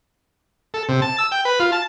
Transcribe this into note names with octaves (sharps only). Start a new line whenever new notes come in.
A4
C3
A5
E6
G5
B4
F4
A5